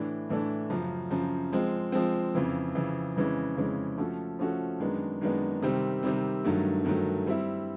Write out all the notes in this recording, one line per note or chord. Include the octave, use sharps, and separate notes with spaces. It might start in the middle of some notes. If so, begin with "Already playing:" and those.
Already playing: A2 E3 A3 D4
A2 E3 A3 D4
F#2 C#3 F3
F#2 C#3 F3
F3 G#3 C4
F3 G#3 C4
F2 C#3 E3
F2 C#3 E3
F2 C#3 E3 G#3 C#4
F2 C#3 E3 G#3 C#4
F3 A3 C#4 F#4 A4
F3 A3 C#4 F#4 A4
F#2 D#3 G#3 B3 D4
F#2 D#3 G#3 B3 D4
C3 D#3 G3 C4
C3 D#3 G3 C4
G2 D#3 F#3 A3
G2 D#3 F#3 A3
G3 C4 E4